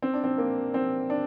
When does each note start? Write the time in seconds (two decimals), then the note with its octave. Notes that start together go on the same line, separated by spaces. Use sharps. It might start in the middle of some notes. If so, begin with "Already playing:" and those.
0.02 C4
0.14 D4
0.24 C4
0.38 A#3
0.74 C4
1.10 D4